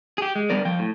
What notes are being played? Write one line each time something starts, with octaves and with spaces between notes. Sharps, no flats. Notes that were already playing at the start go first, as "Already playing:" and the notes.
G4 G#4
G#3
G2 G3 B3 A#4 D5
F3 G5
A2